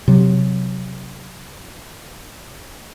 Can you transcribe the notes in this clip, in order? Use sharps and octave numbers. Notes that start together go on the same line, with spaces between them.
C3 F#3